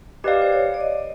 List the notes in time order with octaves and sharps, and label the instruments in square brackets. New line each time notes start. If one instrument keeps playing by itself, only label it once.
[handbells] G4 B4 D5 F5 [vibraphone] D#5
[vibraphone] C5
C#5
D5
D#5